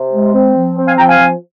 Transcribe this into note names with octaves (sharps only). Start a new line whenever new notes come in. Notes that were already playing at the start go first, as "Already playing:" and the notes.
Already playing: C3
G#3
C4
F3
C4
F5 G#5
F3 G5 A#5
F5 G#5
F3